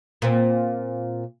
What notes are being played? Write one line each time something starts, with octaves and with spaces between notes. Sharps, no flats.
A#2 C4